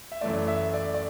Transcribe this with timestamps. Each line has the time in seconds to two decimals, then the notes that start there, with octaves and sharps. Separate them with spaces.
0.12 E5
0.21 F#2 E3 A3 D5
0.48 E5
0.73 D5
0.94 D5